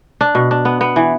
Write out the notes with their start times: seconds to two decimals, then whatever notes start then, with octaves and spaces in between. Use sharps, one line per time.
0.21 D4
0.35 B2
0.51 D4
0.65 B3
0.81 B3
0.96 E3